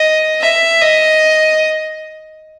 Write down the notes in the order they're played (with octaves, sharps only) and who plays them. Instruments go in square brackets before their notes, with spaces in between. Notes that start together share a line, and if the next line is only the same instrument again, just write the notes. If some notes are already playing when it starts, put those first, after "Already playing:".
Already playing: [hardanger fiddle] D#5
E5
D#5